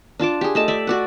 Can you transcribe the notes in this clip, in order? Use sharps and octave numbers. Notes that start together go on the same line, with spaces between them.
D4 F4 A5 D6
G4 G#4
A3 D#5 A5
D5 E5
F#4 D5 F#5